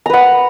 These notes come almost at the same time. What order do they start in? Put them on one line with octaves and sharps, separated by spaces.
A#5 B4 F#5